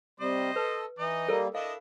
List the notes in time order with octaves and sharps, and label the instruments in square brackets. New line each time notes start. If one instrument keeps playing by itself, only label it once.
[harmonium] C3 G3 [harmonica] C5 D#5
[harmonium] A4 [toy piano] B4
[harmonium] E3 [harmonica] D#4 D#5
[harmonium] G3 A#3 [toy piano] A4 A#4
[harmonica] D4 E4 [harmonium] D#5 [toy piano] F5